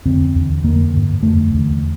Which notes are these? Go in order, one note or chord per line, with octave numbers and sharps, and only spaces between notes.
F2 D3 C4
E2 D3
F2 D3 A#3
G2 D3
F2 D3 A3
E2 D3